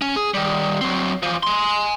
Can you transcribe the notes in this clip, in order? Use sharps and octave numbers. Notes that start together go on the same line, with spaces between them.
C#4
G#4
D#3 G3
F#3 C4
E3 F3
G#5 C6